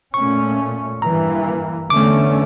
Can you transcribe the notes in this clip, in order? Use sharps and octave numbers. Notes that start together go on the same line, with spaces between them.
A#2 A3 C#4 C#6
G2 E3 A#3 A#5
E2 D3 A3 C#4 D6